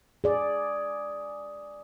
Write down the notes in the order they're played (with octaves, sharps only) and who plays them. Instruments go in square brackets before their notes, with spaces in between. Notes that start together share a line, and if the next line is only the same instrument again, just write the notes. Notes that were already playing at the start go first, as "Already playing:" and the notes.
[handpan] G#4 D5